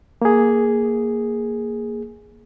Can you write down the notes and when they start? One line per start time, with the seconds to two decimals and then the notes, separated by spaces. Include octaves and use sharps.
0.22 A#3 G#4